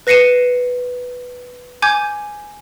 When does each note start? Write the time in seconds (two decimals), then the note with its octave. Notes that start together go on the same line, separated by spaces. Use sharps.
0.07 B4 A#6 C7 C#7 D#7 E7
1.82 G#5 D6 G6 G#6